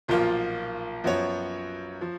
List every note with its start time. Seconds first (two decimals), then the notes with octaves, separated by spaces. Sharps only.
0.08 B1 A#2 F3 A#3 F4
1.04 F#2 F3 B3 F#4 C#5
2.01 F3